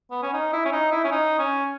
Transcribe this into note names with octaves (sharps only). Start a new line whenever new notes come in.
B3
C#4
D#4
E4
C#4
D#4
E4
C#4
D#4
C#4